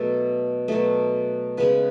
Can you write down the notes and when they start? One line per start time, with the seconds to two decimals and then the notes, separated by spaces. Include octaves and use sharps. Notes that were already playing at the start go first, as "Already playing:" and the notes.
Already playing: B2 F#3 A3 A4
0.68 B2 F#3 A3
1.57 C#3 G#3 B3 B4